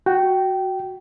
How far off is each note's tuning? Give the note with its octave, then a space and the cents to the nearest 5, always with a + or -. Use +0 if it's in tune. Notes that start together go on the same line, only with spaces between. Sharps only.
F#4 +0 G5 -15